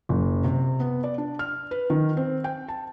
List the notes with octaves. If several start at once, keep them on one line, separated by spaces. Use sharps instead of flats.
F#1
C3
B3
D5
D4
F6
B4
D#3
C4
G5
A5